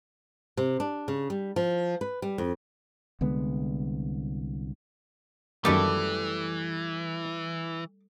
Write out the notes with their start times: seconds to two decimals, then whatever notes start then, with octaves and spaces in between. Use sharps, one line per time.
0.57 C3
0.80 D4
1.08 C#3
1.30 G3
1.56 F3
2.01 B4
2.22 G3
2.38 F2
3.21 C2 D3 G#3 B3
5.65 F#2 D#3 E3 G3 A3 A#3 D6